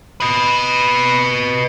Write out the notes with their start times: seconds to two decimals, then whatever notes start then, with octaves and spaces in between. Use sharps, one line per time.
0.20 B4 D#5